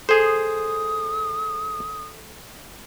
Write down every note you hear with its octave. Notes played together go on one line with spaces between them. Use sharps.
G#4 A4 C5 D#6